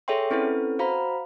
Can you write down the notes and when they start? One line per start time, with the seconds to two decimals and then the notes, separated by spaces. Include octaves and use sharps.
0.08 G#4 A4 C#5 E5 G5 C6
0.31 C4 C#4 E4 A4 B4
0.79 F#4 C5 F5 A#5 B5